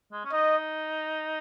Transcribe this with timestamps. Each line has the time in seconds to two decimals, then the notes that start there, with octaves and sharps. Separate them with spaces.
0.12 G#3
0.25 C#4
0.32 D#4 D#5